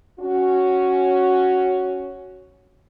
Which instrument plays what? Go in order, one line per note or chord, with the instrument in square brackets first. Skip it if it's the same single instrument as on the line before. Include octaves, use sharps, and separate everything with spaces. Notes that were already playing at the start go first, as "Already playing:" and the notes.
[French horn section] C#4 F#4